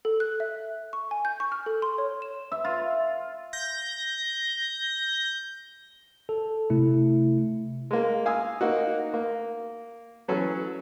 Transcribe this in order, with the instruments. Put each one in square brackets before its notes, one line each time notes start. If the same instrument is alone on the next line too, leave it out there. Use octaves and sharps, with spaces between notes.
[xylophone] A4
F#6
E5
C#6
G#5
G6
C#6
F6
A4
C6
C#5
E7
[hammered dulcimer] E5
F4
[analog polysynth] G6 A#6
[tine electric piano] A4
C3 A3 E4
[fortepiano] G#3 A#3
F5 G#5 D#6 E6
A#3 D#4 F#4
A#3
E3 F#3 C#4 A4